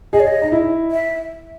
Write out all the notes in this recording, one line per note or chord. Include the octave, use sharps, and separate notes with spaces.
G#4 D#5
C#5
D#5
D#4
E4
E5